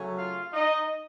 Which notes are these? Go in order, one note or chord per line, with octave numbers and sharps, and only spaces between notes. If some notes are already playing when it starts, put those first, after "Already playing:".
Already playing: C#3 F#3 A3 C#4
F4 F5
D#4 D#5